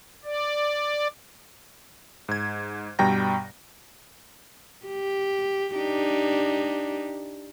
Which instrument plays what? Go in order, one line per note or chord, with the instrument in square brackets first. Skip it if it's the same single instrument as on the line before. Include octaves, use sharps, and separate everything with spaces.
[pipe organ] D5
[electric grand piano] G#2 G#6
G2 B2 G3 G5 A#5 A#6
[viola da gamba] G4
D4 D#4 G4